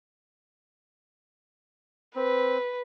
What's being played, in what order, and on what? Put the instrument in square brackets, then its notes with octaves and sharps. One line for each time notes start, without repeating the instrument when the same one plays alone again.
[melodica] C4 [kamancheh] B4